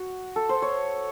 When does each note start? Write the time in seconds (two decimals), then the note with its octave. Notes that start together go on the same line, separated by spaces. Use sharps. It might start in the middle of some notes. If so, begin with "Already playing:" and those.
Already playing: F#4
0.36 A4
0.49 C5
0.62 C#5